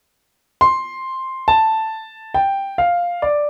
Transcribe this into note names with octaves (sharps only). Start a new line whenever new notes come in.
C6
A5
G5
F5
D5